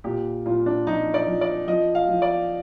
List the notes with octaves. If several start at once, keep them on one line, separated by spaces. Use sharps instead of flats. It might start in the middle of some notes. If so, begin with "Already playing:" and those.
A#2 G4
A#2 F4
D4
F3 D#4
D5
F3
D5
F3 D#5
F5
F3
D5